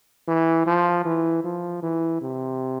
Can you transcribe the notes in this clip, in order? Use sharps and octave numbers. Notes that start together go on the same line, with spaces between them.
E3
F3
E3
F3
E3
C3